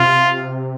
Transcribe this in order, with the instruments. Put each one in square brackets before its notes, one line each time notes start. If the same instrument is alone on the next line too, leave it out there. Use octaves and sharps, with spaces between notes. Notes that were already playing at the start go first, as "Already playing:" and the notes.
Already playing: [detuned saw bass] C3 [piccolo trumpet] F4